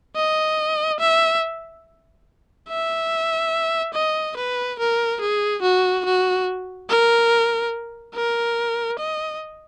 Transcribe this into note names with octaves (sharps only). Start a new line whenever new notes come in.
D#5
E5
E5
D#5
B4
A#4
G#4
F#4
F#4
A#4
A#4
D#5